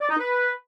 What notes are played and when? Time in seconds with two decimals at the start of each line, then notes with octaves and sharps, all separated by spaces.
0.01 D5
0.10 D#4
0.19 B4